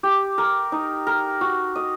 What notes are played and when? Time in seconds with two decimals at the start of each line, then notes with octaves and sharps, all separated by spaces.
0.03 G4
0.38 A#4
0.72 D#4
1.07 A#4
1.41 F#4
1.75 D#5